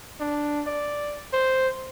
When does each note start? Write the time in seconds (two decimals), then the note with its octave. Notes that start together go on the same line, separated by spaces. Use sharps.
0.20 D4
0.66 D5
1.33 C5